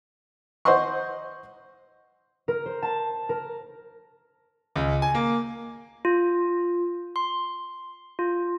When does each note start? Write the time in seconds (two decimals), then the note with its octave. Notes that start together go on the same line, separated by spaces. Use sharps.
0.65 C5 D#5 F#5 C6 C#6
2.48 A#4
2.66 C5
2.82 A5
3.29 A#4
4.76 C#2
5.02 G#5
5.15 A#3
6.05 F4
7.16 C6
8.19 F4